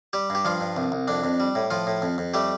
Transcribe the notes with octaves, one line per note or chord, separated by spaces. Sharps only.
G3 G4
G2 G4
G2 F3 F4
G2
C2
C2
F2 D4
F2
G3
A2
A2 F3 F4
A2
F2
F2
G3 A3 G4